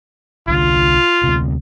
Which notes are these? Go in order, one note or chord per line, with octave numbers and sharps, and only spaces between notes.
C2 D3 F4
D2 C3